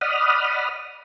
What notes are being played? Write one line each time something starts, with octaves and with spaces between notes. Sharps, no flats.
D5 D#5 F#5 B5 D#6 F6